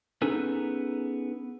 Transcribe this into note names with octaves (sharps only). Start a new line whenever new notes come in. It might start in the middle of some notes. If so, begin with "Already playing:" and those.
B3 C#4 D#4 G#4 A4 B4